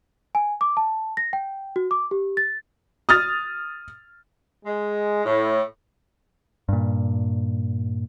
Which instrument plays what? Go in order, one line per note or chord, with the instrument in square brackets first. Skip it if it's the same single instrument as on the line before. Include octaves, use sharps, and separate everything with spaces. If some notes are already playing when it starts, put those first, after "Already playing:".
[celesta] G#5
D6
A5
A#6
G5
F#4
D6
G4
A6
[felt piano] D#6 F6 A6
[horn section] G#3
A2
[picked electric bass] G2 A#2